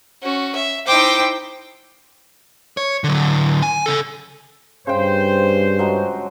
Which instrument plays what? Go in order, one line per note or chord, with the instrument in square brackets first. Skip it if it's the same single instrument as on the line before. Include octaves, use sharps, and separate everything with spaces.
[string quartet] C#4 F#4
E5
D#4 E4 C5 G5 D6
[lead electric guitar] C#5
D3 F#3
G#5
C#3 A4
[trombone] G2 [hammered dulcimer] C#3 G5 [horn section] C5
[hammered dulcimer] F3 F#3 G#3